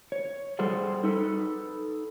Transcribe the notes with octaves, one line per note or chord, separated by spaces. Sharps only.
C#5
G3 G#4 A4 C5 F#5
D#4 A4 B4